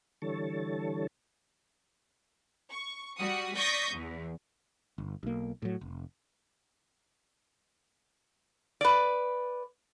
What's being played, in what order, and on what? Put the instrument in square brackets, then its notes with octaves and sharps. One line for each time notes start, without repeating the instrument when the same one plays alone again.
[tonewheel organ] D3 E3 G3 A4 C#5 A5
[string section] C#6
G3 F#4 D#6 C#7
D5 C#6 D#6 G6 A#6 B6
E2
[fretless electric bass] G1
B1 A#3
A2 F#3
F1
[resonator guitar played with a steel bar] B4 D5